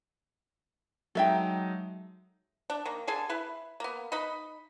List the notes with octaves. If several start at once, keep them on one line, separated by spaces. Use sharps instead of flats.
F#3 G#3 D#4 A4 E5 G5
D4
D#3 A#3
D3 G#4 A4 G#5
E4 B4
A#3 B3
D#4 B4 D#5 B5